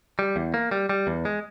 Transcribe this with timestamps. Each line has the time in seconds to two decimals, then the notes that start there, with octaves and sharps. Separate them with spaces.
0.19 G3
0.36 E2
0.54 A#3
0.71 G3
0.89 G3
1.07 E2
1.25 G#3